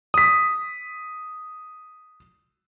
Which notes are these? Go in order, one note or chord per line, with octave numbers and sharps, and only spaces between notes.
D#6 B6